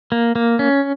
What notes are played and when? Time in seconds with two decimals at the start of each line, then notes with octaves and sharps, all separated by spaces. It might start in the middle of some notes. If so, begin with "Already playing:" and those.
0.12 A#3
0.36 A#3
0.59 C#4